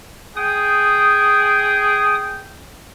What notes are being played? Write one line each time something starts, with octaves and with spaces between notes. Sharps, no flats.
G#4 G5 D#6